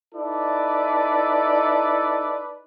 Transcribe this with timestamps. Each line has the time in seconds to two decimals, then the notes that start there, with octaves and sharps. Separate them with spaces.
0.15 D#4 E4 A4 B4 D5